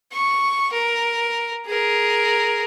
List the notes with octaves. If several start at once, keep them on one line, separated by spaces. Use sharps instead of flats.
C#6
A#4
G#4 A#4